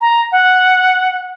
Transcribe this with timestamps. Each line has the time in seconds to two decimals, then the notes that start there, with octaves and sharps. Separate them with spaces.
0.01 A#5
0.32 F#5